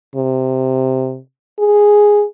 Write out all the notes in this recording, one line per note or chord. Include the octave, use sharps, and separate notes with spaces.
C3
G#4